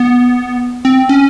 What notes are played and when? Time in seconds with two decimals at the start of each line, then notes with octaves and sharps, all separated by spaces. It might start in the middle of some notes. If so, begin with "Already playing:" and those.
Already playing: B3
0.85 C4
1.09 C#4